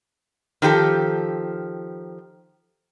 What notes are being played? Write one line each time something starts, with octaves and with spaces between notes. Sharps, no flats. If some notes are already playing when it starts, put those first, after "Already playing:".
D#3 F3 G4 A4